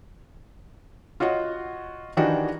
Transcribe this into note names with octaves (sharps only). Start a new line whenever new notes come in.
F4 F#4 C#5 D#5 F#5
D#3 E3 D4 D#4 F#4 G4